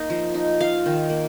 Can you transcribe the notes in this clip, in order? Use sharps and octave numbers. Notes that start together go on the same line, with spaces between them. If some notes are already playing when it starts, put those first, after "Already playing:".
Already playing: A#3 D#4 D#5
F3
D#4
F4 F5
D#3
A#3